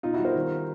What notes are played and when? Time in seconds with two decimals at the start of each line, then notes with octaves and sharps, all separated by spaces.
0.03 B2 D#4 F4
0.14 E4 F#4
0.19 G3
0.25 A#4 C5
0.36 D#3